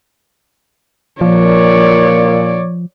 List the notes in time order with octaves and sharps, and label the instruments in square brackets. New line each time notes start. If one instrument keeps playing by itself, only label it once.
[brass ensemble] A#2 [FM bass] F3 [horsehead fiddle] C#5 D5